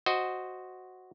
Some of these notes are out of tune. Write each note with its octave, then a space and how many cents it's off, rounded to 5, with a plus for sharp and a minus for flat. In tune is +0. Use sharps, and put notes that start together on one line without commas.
F#4 +0 C5 +0 D#5 +0